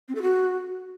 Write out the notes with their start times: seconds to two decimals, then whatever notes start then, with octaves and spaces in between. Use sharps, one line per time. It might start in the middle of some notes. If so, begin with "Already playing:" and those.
0.08 C4
0.15 A4
0.22 F#4